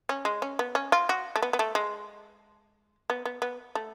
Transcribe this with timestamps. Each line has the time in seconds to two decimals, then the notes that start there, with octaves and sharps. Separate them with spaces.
0.09 C#4
0.25 G#3
0.42 C#4
0.59 B3
0.75 C#4
0.92 F4
1.09 F#4
1.36 A3
1.42 B3
1.53 B3
1.59 A3
1.75 G#3
3.10 B3
3.25 B3
3.42 B3
3.75 A3